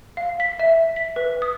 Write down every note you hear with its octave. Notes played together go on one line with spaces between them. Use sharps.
F5
B6
E5
B6
B4
D#6